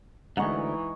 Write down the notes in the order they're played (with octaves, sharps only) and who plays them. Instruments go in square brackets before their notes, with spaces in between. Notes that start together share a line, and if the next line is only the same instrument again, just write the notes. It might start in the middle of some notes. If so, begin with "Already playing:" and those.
[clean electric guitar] D2 G2 [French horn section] E3 [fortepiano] G#3 F#5 [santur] D#4 C#6